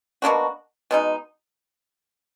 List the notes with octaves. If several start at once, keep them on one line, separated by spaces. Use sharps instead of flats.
B2 A#3 D4 F#4
B2 G#3 D#4